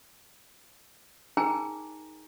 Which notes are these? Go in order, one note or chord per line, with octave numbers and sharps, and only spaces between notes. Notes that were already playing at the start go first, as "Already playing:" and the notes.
D#4 G#4 A#4 G5 G#5 A#5